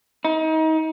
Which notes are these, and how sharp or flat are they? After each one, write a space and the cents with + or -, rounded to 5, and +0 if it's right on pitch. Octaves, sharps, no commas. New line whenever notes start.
D#4 +30